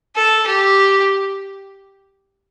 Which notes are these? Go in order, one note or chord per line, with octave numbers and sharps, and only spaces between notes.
A4
G4